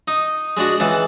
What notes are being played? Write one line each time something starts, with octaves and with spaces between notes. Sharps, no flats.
D#4
G#3 D4 F#4
C#2 E3 F#5 A5